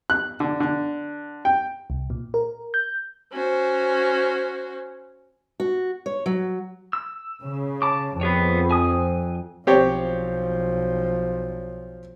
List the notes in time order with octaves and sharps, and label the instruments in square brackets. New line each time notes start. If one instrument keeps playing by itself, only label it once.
[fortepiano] F#6
D3
D3
G5
[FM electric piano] C2
A#2
A#4
G6
[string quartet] C#4 F#4 C5
[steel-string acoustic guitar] F#4
C#5
F#3
[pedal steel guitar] E6
[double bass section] C#3
[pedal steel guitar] A5 D6
[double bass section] F2 [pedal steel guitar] B3 G#4 C#5
[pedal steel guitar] G#5 D#6
[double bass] B1 F3 [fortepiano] C4 G4 C#5